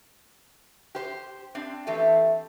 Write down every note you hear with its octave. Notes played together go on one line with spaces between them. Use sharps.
G4 C5
C4 D4
E3 A3 C4 G4